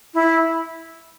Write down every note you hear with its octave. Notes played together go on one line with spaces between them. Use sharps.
E4